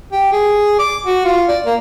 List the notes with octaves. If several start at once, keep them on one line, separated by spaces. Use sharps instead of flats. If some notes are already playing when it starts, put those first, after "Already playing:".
G4
G#4
D6
F#4
F4
D5
A#3